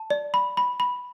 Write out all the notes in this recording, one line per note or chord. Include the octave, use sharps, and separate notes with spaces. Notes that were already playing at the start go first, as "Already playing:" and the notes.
Already playing: A5
D5
B5
B5
B5